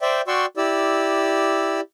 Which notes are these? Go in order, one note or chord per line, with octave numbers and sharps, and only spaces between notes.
C5 D5 E5 G5
F#4 D5 G5 C6 C#6 E6
E4 G4 D5 E6